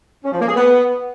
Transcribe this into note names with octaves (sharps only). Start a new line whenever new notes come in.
C#4
F3
A#3
G#4
B3